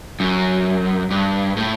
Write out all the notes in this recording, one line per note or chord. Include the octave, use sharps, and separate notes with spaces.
F#2
G2
A2